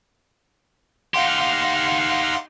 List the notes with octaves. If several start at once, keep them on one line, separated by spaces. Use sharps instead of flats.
D#4 G4 F5 F#5 C6